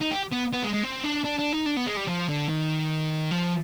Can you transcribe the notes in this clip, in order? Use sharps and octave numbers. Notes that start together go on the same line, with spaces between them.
D#4
G4
B3
B3
G#3
G#3
C4
D4
D4
D4
D#4
D4
B3
G#3
G3
F3
D3
D#3
F3